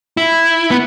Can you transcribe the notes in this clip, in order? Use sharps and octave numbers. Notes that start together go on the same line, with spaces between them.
E4
B3